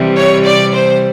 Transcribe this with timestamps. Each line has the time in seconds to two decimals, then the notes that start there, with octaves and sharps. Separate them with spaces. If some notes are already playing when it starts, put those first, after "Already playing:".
Already playing: C3 E3 G3
0.17 C#5
0.45 D5
0.74 C5